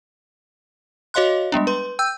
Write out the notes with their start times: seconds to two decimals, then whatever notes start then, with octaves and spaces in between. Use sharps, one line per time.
1.14 F#4 C#5 D#5 F5 C6 F#6
1.52 G3 G#3 B3 D4
1.67 B4 C6
1.99 G5 E6 G6